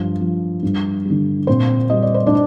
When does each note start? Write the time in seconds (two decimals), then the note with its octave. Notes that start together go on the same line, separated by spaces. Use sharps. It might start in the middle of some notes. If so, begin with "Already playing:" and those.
Already playing: G2 F3
0.21 F3
0.63 G2
1.05 D3 G3
1.47 A#2 C4 C5
1.90 G3 D#5
2.02 D5
2.14 C5
2.27 D4 D5